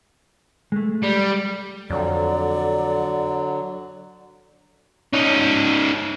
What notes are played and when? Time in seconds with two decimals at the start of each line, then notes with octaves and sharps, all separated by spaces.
0.72 G#3 A3
1.03 G3
1.90 F2 D3 F#3 D5
5.13 C#4 D#4